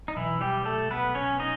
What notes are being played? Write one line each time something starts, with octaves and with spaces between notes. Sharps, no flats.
D#4
C2 B2 E3 F#3 E4
G3 G4
A3 A4
B3 B4
C#4 C#5
D#4 D#5